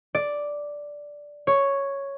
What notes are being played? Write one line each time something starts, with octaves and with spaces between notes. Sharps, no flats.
D5
C#5